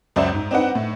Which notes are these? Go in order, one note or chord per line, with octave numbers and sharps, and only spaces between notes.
C#2 F#2 F#4 C5 D5 E5
G#2
C4 D4 D#4 B4 F#5
A2